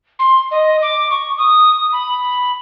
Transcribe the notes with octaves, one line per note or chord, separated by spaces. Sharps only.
C6
D#5
D6
C#6
D#6
B5